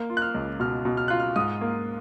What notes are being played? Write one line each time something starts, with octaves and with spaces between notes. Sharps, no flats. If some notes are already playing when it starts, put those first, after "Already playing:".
Already playing: A#3
F4
F#6
F6
C#2
B2 F6
B2
F6
F4 F#6
F6
G#2 D#6
A#3